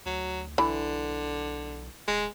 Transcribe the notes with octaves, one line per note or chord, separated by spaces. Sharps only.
D2 F#3
B1 D3 E3
D#1 G#3